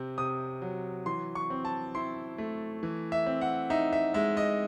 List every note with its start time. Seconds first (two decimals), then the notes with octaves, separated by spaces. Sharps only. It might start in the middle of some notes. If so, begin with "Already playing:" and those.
Already playing: C3 C4
0.18 C3 D#6
0.62 F#3
1.06 E3 C6
1.35 C#6
1.50 C4
1.65 A5
1.95 E4 C6
2.38 A3
2.83 E3
3.12 E5
3.26 C4
3.41 F#5
3.70 D#4 E5
3.93 E5
4.14 G#3 E5
4.37 D#5